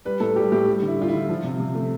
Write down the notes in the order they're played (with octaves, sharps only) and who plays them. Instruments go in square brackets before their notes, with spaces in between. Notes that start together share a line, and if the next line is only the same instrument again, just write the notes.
[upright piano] G3 B4
A2 A4
G3 G4
A2 G4
G3
D3
E4
G3 F4
E4
D3
F3
C3
C3
A3